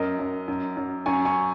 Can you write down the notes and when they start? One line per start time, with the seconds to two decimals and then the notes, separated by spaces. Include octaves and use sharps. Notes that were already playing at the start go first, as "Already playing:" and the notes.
Already playing: F#2 A#4 D#5
0.19 F#2
0.48 F#2
0.77 F#2
1.06 F#2 G#5 C#6
1.25 G#5 C#6